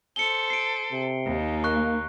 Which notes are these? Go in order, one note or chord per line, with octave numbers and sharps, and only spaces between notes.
A4 C5 C#7 G7
C7 D7
C3
D#2 D#4
A#3 C#6 F#6